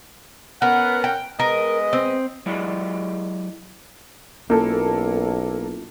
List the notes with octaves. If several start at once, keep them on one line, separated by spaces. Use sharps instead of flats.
B3 C#4 A#4 F#5
G5
G#3 B3 A#4 D#5
C4
F#3 G#3 E4 G4 D5 D#5
B1 A#3 C#4 E4 F4 A4